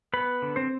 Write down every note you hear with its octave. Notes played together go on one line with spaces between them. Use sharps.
B3 B4 B5
D3
C4 C5